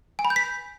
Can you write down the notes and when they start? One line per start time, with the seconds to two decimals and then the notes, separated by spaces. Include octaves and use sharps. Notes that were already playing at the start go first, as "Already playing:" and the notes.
0.19 G#5
0.25 B5
0.30 G6
0.36 B6